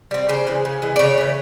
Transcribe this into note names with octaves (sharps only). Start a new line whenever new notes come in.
G3 C4
C#3 C5
E3 G#3
C#3
E3 G#3
D5
C#3 C#5
E3 A3